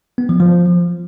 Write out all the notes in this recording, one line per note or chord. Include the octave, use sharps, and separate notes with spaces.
B3
F3
F3